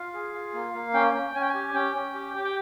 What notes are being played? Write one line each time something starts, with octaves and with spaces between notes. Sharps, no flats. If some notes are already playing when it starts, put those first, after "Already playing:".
Already playing: F4 F5
G#4
F4
A#3
A#3
C#4 G5
C#4
C#4 G#5
G5
G#5
G4
C#4 G5
C#4
G4
G4
G5